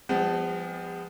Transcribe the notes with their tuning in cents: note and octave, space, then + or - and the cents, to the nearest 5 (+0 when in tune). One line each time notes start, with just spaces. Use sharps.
F3 +0 G#3 -45 B3 +25